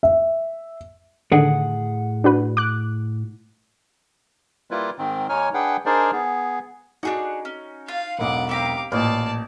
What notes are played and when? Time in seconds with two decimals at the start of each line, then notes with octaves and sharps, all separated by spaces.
0.03 E5
1.32 A2 D3 D#3 G#4 F#5
2.24 D4 F#4 B4
2.57 D6 F#6
4.71 G3 A#3 E4 F4 B4
4.98 G#2 D#3 C4
5.29 D#2 D#4 C#5 G#5 F6
5.54 D4 G#4 B4 F#5 G5
5.86 D4 D#4 G#4 A#4 C5 D5
6.12 B3 G#4
7.03 D4 D#4 F#4 G#4 F#5
7.45 C#4
7.88 F4 F5
8.19 E1 B1 F#5 D6
8.49 C4 G4 F5 A#5 D6
8.92 A1 A#2 D5 F5 A5